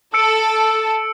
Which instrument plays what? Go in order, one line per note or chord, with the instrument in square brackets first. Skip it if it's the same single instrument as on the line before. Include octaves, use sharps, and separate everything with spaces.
[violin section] A4 [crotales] E6 C#7 D7